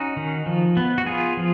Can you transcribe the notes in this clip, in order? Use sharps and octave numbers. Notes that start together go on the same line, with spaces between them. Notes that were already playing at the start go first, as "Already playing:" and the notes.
Already playing: C#4 D#4 F#4
D#3
F3
B3
F#4
B3 F4 G#4
F3